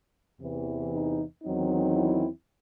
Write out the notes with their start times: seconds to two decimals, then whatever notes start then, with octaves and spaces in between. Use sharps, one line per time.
0.39 E2 C3 E3
0.91 D#4
1.42 E2 D#3 F#3 C4 D#4
1.95 E4